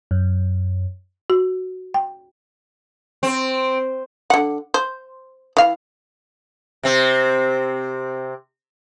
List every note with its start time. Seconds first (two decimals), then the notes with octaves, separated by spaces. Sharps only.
0.11 F#2
1.30 F#4
1.94 G5
3.23 C4
4.30 D3 F#5
4.74 C5
5.57 E3 F5
6.83 C3 C4